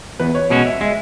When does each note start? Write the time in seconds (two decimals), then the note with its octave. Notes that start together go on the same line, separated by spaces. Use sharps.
0.20 E2 B4
0.35 C#5
0.50 B2 G#3 C#4 F#4 D#5
0.66 E5
0.81 G#3 E5